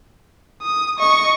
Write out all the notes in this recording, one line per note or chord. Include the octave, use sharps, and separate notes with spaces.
D#6
D#5 C#6